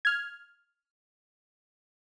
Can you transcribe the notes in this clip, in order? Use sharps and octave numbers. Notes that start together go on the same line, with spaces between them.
F6 G#6